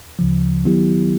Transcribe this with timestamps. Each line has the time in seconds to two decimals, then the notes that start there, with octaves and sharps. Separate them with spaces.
0.19 D2 C#3 F3
0.64 D#3 F#3 B3 E4 G4